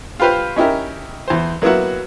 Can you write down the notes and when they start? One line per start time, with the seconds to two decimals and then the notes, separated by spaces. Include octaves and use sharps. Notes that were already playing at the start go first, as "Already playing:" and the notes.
0.20 F4 G4 B4 C5 F5
0.56 C#4 D#4 E4 G4 A#4
1.28 E2 C5
1.62 F#3 A#3 B3 E4 F#4